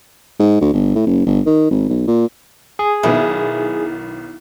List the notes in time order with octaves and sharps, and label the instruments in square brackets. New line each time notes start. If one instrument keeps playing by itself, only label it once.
[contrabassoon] G#2
D2
G1
A2
F#1
G1
D#3
G#1
B1
A#2
[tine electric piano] G#4
[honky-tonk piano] B1 D#3 B3 [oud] E4